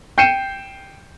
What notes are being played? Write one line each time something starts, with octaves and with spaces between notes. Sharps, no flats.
G5 G6 C7 C#7 D#7 E7